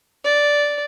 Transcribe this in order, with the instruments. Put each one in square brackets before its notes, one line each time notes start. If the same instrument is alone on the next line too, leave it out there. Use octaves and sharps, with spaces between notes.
[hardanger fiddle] D5